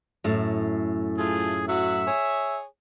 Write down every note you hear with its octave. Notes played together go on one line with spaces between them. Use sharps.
F#2 A2
A3 F4 G#4
F#3 F#4 E5
G#4 C#5